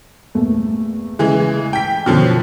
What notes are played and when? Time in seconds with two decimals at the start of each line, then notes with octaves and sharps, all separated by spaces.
0.35 E2 A#2 A3
1.19 C#3 E3 G#3
1.73 G5 B6
2.06 F#2 B2 D3 F3 F6